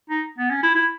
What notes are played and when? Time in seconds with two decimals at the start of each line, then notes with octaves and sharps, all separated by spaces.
0.10 D#4
0.38 B3
0.50 C#4
0.63 E4
0.75 E4